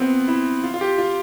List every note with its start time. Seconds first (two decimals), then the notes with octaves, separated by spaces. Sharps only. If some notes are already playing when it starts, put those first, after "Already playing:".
Already playing: B3 C4 F4
0.28 E4
0.64 F4
0.74 F4
0.81 G4
0.98 F4